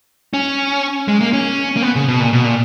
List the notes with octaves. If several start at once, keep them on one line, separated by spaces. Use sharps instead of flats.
C#4
G#3
A#3
C#4
A#3
B3
C#3
B2
A#2
B2
A#2